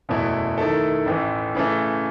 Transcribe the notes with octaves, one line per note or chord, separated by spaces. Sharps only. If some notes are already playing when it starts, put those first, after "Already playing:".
F#1 E2 B2 A3 E4
D#3 A3 E4 A4
A1 A2 E3
C#3 E3 A3